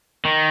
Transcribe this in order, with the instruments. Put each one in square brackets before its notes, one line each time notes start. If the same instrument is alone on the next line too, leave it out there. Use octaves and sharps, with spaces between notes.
[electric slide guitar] D#3